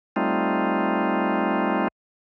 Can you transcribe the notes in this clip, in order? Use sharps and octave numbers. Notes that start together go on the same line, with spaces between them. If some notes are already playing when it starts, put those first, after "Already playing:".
G3 A3 C4 D#4 F4